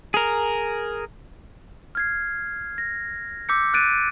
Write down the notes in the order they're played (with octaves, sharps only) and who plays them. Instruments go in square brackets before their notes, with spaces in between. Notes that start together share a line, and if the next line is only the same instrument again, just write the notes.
[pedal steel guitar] G#4 A#4
[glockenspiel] F6 G#6 C7
A#6
D6 E6 G6 B6 C#7
F#6 A6 D7 D#7